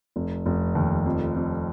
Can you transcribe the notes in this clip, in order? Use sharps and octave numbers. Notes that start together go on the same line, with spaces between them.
F1
F1
D#2
F2
F2